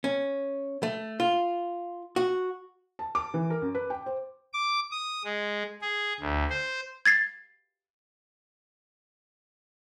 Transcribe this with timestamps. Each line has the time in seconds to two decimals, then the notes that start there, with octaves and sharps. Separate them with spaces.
0.04 C#4
0.83 A3
1.20 F4
2.16 F#4
2.99 A5
3.15 D6
3.34 E3
3.50 A#4
3.62 F#2
3.75 B4
3.90 G5
4.06 C5
4.53 D6
4.91 D#6
5.24 G#3
5.82 G#4
6.20 D2
6.50 C5
7.06 G#6 A6 C7